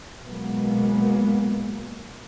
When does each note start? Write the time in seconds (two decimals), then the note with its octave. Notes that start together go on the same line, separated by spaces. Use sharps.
0.25 B2 F#3 G#3 A#3 B3